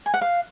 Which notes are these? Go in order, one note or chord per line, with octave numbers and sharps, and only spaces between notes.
G#5
F#5
F5